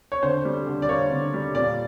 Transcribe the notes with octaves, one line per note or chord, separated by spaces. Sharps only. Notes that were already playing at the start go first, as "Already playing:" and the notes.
C#5
D3 C5
G3
D3
D5
A#3 C#5
D3
G3
A#2 D5